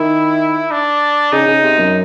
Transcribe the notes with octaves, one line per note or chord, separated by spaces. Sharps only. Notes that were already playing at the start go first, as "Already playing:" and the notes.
Already playing: D#3 E4
D4
C#3 D#4
C#3
C3
F#2